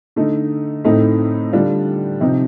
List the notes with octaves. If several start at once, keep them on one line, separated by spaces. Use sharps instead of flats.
D3 A3 D#4
A2 A3 C4 D#4
D3 G3 D4 F4
C3 F3 C4 D#4